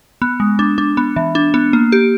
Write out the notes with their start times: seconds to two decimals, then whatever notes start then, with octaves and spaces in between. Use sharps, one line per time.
0.22 B3
0.40 G#3
0.59 D4
0.78 D4
0.97 B3
1.16 E3
1.35 D4
1.54 B3
1.73 A#3
1.92 G4